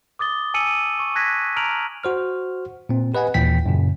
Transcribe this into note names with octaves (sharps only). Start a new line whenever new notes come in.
D6 D#6 A6 G7
G#5 A5 E6 C#7 D#7 F#7
C#6
A5 F#6 G#6 A#6 B6 D#7
A5 A#5 F6 D7 F7 F#7
F#4 C5 F6
A#2 C4
G4 B4 D#5 F#5 G#5
D#2 A#2 E3 G5 B6
F#2 A#2 C#3